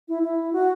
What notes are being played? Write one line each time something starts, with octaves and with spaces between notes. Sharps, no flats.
E4
E4
F#4